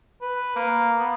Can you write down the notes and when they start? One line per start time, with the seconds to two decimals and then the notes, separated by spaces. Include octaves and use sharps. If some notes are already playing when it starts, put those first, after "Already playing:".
0.21 B4
0.56 A#3
0.99 B3